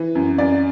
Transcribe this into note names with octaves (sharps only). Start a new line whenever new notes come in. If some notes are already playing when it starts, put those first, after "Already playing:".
Already playing: E3
F#2
F#2 D5